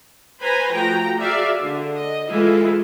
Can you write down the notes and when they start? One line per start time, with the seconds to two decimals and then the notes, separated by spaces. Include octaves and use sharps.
0.41 B4 C5 G#5 A#5 B5
0.72 F3 A3 F#4 G5 A#5
1.17 F#4 G#4 D5 E5 F5
1.60 D3
1.97 D#5
2.28 E3 G#3 E4 F4 A4